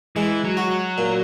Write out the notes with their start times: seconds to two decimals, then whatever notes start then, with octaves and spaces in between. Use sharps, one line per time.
0.16 E3 G#3
0.44 F#3
0.57 F#4
0.70 F#3
0.98 A#2